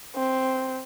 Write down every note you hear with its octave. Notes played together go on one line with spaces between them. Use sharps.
C4